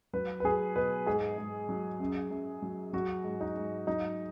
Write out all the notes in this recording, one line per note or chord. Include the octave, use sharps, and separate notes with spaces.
F#3 B4
B4
F#3 G#4
B2 B4
G#2 G#4
G#2
F#3
F#2
F#2
F#3
F#3 F#4
G#2
D#4
G#2
F#3 D#4